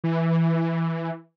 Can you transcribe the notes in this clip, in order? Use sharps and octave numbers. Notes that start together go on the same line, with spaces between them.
E3